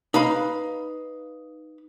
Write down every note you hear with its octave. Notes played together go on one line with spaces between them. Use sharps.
D#4 B4 F5 B5